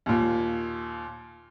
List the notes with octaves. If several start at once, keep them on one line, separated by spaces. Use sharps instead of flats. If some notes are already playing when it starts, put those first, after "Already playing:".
D#2 A#2